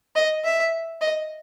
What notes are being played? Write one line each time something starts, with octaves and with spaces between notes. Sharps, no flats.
D#5
E5
D#5